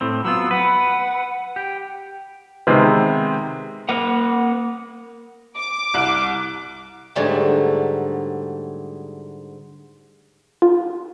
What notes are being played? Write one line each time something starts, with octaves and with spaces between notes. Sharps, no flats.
A2 C4
F#3 B3 F4 E6
B4 F#5
G4 G5
C3 D#3 G#3 B3 C4
A#3 A#4 F#5
D6
C2 F#6
G#2 D3 F#3 G3 A3
F4